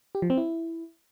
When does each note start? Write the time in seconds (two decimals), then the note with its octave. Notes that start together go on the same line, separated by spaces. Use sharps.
0.15 G4
0.22 F3
0.30 C4
0.37 E4